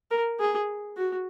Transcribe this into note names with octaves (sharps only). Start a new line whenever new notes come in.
A#4
G#4
F#4